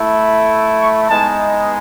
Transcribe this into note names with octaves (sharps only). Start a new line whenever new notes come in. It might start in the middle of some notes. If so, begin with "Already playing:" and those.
Already playing: A3 E4
C#6
G#3 B3 D#4 A5